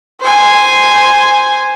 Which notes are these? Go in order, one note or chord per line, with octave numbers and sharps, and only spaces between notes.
C5 G#5